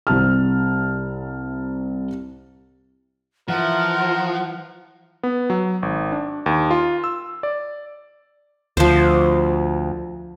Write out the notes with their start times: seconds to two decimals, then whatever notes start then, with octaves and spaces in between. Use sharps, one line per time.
0.07 C2 C3 A5 F6
3.48 E3 F3 A#4 F#5
5.23 B3
5.50 F#3
5.83 G#1
6.12 D4
6.46 D#2
6.71 F4
7.04 E6
7.43 D5
8.77 D2 F3 C5